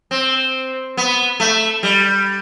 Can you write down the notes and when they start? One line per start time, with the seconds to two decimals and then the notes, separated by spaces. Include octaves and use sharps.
0.11 C4
0.97 B3
1.40 A3
1.83 G3